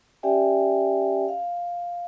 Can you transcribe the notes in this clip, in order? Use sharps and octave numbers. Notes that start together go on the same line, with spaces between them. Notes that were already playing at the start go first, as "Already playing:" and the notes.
C#4 G4 D5 E5 G5 G#5
F5